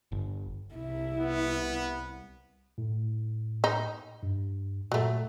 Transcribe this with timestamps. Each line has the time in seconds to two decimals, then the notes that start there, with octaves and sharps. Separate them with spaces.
0.12 G1
0.75 C2 E4
1.20 B3
2.78 A2
3.64 D#4
4.23 G2
4.92 A#2 F#3 A3